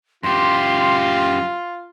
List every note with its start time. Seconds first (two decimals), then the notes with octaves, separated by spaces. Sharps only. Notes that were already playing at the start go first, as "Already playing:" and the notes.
0.23 F#2 F4 G4 C6